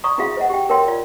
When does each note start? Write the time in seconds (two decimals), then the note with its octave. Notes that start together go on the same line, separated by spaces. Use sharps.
0.04 D5 A#5 C#6 D#6
0.18 D#4 E4 F#4 G#4 E5 F5
0.37 C5 D#5 E5 F#5
0.50 G4 G5
0.69 D#4 A#4 C#5 E5 G5 C6
0.88 F4 D5